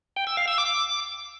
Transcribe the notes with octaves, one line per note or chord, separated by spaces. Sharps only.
G5
E6
F5
E6
D6